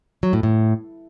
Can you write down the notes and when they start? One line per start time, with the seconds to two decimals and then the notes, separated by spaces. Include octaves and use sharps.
0.23 F#3
0.33 A2
0.43 A2